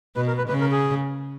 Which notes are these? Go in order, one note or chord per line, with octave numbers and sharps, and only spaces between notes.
B2 B4
A#4
B4
C#3 B4
A#4
G#4